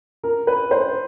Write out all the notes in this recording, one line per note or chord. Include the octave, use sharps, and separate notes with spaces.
A#4
B4
C5